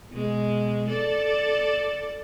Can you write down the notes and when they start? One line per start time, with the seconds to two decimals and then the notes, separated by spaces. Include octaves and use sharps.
0.10 B2 G#3
0.88 A4 D5